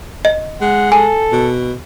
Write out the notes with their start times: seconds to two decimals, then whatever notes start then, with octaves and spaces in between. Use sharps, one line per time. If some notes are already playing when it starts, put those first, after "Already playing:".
0.25 D#5
0.61 G#3 F#5
0.92 A4 G#5
1.32 B2